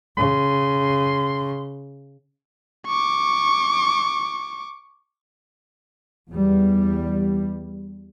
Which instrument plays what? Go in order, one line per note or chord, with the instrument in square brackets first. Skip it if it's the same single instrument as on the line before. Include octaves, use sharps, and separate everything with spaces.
[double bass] C#3 [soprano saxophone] C6
[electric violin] C#6 D6
[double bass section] E2 G3